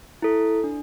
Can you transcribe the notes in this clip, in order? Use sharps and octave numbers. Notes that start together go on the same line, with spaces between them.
E4 A4
D4